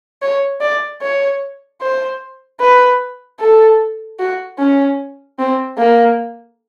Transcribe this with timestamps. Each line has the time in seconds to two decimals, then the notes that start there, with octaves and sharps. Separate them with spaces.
0.22 C#5
0.61 D5
1.02 C#5
1.81 C5
2.60 B4
3.40 A4
4.19 F#4
4.59 C#4
5.39 C4
5.78 A#3